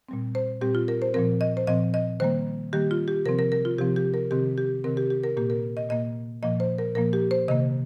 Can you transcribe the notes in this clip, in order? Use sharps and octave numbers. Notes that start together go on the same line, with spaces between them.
A#2 G3 C4
C5
A#2 G3 C4 G4
F4
A#4
C5
A#2 F3 C4 A#4
D#5
C5
A#2 F3 C4 D#5
D#5
D#3 G3 A#3 C5
D#3 G3 A#3 G4
F4
G4
C3 F3 C4 A#4
A#4
A#4
F4
C3 F3 C4 G4
G4
A#4
C3 D#3 C4 G4
G4
C3 D#3 C4 A#4
G4
G4
A#4
A#2 A#3 G4
A#4
D#5
A#2 A#3 D#5
A#2 F3 A#3 D#5
C5
A#4
A#2 F3 A#3 A#4
G4
C5
C3 D#3 A#3 D#5